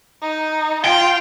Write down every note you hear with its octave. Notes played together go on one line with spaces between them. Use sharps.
D#4
F4 G5